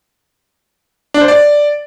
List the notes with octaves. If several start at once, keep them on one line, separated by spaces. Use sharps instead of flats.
D4
C5
D5